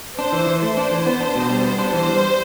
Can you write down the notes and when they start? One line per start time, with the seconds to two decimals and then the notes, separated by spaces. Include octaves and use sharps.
0.18 D4 C5
0.32 E3
0.47 E3
0.62 A3 C5
0.77 D4
0.91 E3
1.06 B3
1.21 D4
1.35 B2
1.50 G3
1.64 B3
1.78 D4
1.93 E3 C5
2.09 G3